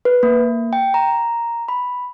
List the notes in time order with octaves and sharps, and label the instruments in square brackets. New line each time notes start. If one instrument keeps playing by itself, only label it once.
[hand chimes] B4
A#3
G5
A#5
B5